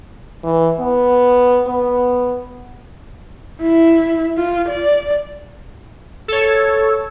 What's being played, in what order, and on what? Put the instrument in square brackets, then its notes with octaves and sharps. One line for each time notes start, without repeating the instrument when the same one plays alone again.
[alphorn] E3
B3
B3
[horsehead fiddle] E4
F4
D5
[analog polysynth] A4 C#5